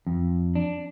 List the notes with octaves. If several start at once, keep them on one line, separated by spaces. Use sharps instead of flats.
F2
D4